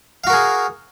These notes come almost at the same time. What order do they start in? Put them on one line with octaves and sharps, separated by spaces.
F5 F#4 A#4 G#4